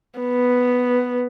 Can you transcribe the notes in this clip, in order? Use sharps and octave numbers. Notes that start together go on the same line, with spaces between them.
B3